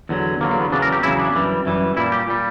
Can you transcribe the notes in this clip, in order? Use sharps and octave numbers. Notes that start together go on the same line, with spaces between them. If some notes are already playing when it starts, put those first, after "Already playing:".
E2 D3 F#3
E2 D3 F#3 A#3
A#3
B3
E2 C#3 F#3 D4
A#4
G4
E2 C#3 F#3 E4
D4
F#2 E3 G3
F#2 E3 G3
A#2 G3 E4
G4
A#2 G3